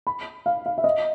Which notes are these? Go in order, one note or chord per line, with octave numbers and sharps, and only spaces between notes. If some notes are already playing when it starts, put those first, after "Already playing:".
B5
F5
F5
E5
D#5